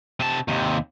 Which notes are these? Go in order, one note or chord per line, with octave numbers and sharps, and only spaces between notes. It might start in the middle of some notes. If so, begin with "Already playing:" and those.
C3 A5
D#2 C3